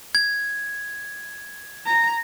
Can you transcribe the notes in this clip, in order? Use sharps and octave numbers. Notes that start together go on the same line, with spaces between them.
G#6
A#5